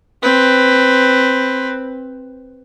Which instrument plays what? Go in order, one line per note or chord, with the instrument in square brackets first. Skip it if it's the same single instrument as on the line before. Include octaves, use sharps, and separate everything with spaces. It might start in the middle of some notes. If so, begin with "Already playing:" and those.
[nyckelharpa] C4 B4